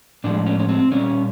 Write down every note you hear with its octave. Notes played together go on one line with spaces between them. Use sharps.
A2 F3 G#3 D4
C#4
C#4
C4
A#2 G3 A#3 C#4